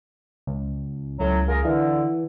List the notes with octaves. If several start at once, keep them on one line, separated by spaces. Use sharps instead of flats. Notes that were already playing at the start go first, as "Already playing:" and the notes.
C#2
C#2 A2 F#3
F4 G#4 A#4
D3 E3